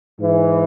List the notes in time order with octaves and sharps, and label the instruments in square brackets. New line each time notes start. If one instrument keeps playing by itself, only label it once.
[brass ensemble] G#2 E3